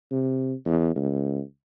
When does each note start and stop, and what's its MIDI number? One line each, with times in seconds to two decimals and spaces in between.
0.11 0.54 48
0.65 0.94 40
0.96 1.41 37